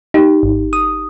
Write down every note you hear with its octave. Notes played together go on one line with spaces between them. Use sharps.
D#4 G4
G#1
D#6